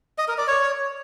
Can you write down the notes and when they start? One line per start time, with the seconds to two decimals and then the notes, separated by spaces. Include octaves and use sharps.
0.18 D#5
0.28 A#4
0.38 D5
0.48 C#5